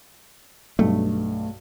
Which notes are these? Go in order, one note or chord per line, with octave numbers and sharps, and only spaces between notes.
B1 G2 A3